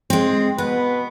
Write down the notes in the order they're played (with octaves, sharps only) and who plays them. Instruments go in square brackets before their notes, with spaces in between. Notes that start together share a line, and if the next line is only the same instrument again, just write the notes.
[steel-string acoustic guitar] G#3 C4
[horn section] B2 B4 [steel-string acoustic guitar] B3